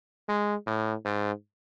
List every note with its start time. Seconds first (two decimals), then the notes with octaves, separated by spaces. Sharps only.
0.28 G#3
0.67 A2
1.05 G#2